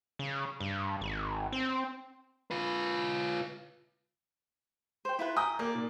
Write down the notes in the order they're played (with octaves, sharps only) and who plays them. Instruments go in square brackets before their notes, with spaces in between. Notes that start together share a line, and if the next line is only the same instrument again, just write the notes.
[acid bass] C#3
G2
G#1
C4
[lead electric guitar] F4 B4
[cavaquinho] C5 G5
E4 F4 B4
[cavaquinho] G5 A#5 [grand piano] G#5 D#6
[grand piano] A#3 [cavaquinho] D5
[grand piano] A#2